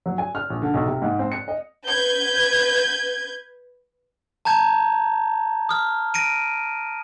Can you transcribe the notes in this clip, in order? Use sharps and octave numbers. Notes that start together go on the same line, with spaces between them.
F#3
G#5
F6
A#1
D3
B1
C3
G#2
C4
C#7
D#5
B4 G6 G#6
A5 A#5 G6 G#6
D#6 F6
A#6 D7 D#7